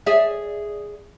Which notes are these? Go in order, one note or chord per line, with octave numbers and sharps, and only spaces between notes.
G#4 D5 E5